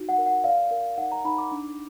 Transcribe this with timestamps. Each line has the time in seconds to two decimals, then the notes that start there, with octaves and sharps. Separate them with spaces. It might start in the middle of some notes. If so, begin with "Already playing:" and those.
Already playing: D#4 F#4
0.09 F#5
0.18 A#4
0.26 F#5
0.44 D5 F5
0.71 A#4
0.98 D#4 F#5
1.12 A#5
1.25 D#4 B5
1.38 D6
1.52 D4